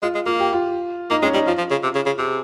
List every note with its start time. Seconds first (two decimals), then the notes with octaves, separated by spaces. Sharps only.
0.02 G#3 F4
0.15 G#3
0.26 A#3 F4
0.40 G4
0.53 F4
1.10 A#3 D#4
1.22 G#3 C#4
1.34 G3 D#4
1.47 F3 F4
1.58 F3
1.71 C#3
1.83 C3
1.95 C#3
2.06 C#3
2.18 C3 G#4